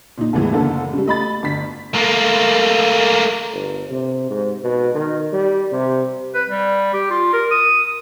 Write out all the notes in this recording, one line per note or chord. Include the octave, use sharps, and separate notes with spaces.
A#2 D#4
E2 A2 E3 G#3
F#1 D3 A#3 B3 A4
C#3 G3
A3 D#5 B5 A6
G1 B6
A3 A#3
G1
C3
G#2
B2
D#3
G3
C3
B4
G3
G4
F4
A#4
D#6